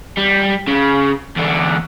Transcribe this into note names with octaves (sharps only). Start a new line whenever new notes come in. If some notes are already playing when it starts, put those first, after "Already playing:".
G3
C#3
E2 D3